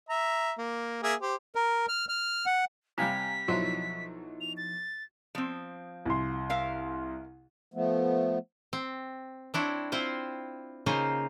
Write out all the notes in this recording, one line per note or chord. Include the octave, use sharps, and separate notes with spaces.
E5 A#5
A#3
A#3 G#4 E5
G4 C5
A#4
F6
F6
F#5
C3 G3 F5 G#5 A#5 B6
B1 F3 F#3 D#4 E4 C6
F7
A6
F3 C4
C2 C6
A#4 E5 F5
F3 A3 B3
C4
C4 D4 E4 C#5
C4 E4 F4 C5
C#3 A#3 D#4 F4 C5 A#5